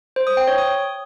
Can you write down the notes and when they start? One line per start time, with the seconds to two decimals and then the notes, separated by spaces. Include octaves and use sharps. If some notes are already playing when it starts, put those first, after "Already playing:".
0.16 C5
0.27 D#6
0.37 G5
0.48 C#5
0.58 D#6